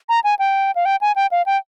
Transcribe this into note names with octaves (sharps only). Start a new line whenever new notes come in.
A#5
G#5
G5
F5
G5
G#5
G5
F5
G5